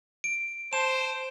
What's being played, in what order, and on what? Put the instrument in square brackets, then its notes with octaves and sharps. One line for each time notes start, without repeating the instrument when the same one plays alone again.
[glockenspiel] D7
[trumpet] C5 [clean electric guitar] A5 [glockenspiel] E7